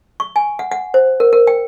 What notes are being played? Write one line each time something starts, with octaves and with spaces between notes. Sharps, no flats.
C#6
G#5
F#5
F#5
C5
A#4
A#4
G5